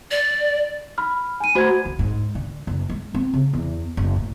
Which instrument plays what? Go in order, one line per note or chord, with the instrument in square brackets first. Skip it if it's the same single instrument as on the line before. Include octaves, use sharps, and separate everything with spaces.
[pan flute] D5
[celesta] B5 F6
G#5 D#7
[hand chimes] A3 F#4 C5 [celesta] B5 G#6
[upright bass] D2
G#2
D3
F#1
G#3
C4
C#3
E2
F#1
A2